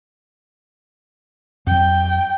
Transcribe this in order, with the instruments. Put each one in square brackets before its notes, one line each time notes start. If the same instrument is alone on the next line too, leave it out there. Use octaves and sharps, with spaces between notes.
[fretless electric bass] F2 F#3 [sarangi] G5